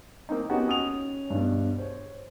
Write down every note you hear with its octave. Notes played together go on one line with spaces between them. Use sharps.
A#3 C4 D#4
B3 C#4 D#4 F#4 G4 G5
C#4 D#6 F7
G2 B2
C5 C#5